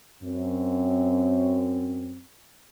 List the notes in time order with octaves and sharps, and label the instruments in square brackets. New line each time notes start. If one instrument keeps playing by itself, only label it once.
[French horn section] F#2 C4